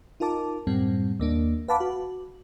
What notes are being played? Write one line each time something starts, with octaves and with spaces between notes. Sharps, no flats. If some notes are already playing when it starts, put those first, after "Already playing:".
D#4 F4 A#4 A5 D6
F#2 A2 G3 C4
D#2 A#3 D4
B4 F5 F#5 A5 B5 D6
F#4